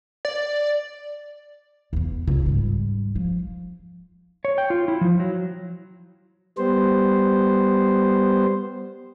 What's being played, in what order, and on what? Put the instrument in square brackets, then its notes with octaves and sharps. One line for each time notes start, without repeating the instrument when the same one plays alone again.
[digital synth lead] D5
[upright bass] E2 B3
C#2
G#2 G3
F3
[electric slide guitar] C#5
G5
F4
E4
F3
F#3
[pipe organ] G3 B3 C5